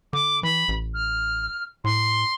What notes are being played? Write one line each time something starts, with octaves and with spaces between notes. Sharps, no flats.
D3 D6
E3 B5
A1
F6
A2 C6